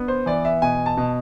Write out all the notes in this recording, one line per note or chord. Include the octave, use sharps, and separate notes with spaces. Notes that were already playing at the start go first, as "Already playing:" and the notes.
Already playing: B3 D4
C5
E3 D5
E5
B2 G#5
A5
B2